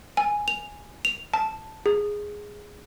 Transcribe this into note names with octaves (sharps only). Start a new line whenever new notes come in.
G#5
F7
F7
A5
G#4